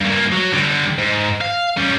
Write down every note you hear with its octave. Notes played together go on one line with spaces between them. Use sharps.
G2 A#3
F#3
D3 G3
G#2
F5
G3 C#4